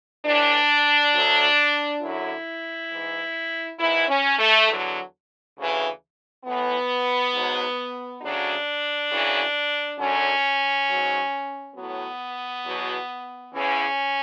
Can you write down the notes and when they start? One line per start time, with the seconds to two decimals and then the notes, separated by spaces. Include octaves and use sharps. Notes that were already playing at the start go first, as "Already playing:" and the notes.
0.25 A2 E3 D4
1.13 D2 D3 F#3
2.01 F#2 D3 F#3 E4
2.91 G#2 E3
3.79 G#2 E3 E4
4.08 C#4
4.39 A3
4.68 E2 D3 F#3
5.56 D2 C#3 E3
6.45 A2 E3 B3
7.33 G#2 F#3
8.21 D2 C#3 F#3 D4
9.11 F#2 C#3 E3
9.98 F#2 D3 F#3 C#4
10.88 G#2 F#3
11.76 A2 F#3 B3
12.65 E2 B2 F#3
13.53 E2 C#3 E3 C#4